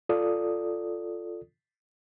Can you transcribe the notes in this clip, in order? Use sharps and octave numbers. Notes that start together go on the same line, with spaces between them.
F4 A4 D5 D#6